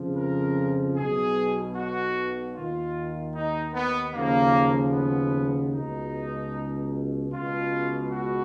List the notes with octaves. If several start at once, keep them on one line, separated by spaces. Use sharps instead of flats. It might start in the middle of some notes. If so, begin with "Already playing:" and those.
Already playing: F2 C#3 F3
A#4
B1 B2 G#4
F#4
D#2 D#3 F4
D#4
B3
D#2 C#3 F3 A#3
B3
C#2 B2 D#4
C#2 B2 F4
F#4